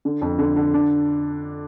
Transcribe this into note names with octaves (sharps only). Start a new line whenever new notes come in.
D3
F2
D3
D3
D4